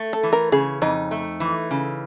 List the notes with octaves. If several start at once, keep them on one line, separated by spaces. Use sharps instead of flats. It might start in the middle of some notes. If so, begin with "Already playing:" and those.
Already playing: A3
A4
E3
A#4
C#3 G#4
F2 D#4
A3
E3
C#3